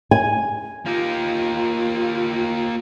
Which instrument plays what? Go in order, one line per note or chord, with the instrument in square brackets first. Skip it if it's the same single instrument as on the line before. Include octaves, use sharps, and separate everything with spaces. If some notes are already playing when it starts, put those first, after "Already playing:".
[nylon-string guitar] G#5
[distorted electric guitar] A#3 G4 [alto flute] F4